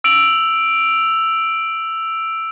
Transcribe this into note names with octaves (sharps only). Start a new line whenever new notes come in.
E6 D7 F7 F#7